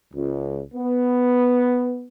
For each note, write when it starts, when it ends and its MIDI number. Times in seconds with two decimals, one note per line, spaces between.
0.14 0.60 37
0.75 2.06 59